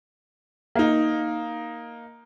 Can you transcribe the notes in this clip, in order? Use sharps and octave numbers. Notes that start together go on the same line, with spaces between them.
A#3 D#4